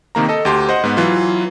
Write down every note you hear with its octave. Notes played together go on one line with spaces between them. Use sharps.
C3 D#3 A#3 A#5
A4 D#5
D2 G4 C6
C5 D#5 F#5
G#2 B3
E3 F#3 F4